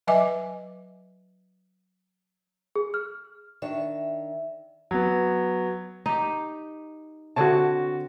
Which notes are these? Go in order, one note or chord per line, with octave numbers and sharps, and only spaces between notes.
F#3 B4 D#5 E5 G#5 D6
G#4
F6
D#3 D4 C#5 E5
F#3 B3
D#4 G4
D3 C4 F#4 C#5 A5